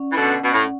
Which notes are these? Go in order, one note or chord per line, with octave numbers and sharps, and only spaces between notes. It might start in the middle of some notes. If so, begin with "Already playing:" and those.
Already playing: C#4 D5 F#5
E3
B2 D3
F#5
B2
A2